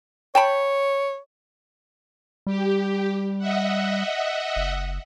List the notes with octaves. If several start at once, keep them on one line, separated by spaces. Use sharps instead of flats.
C#5 G5 A5 B5
G3 G4
D#5 E5 F#5
F#1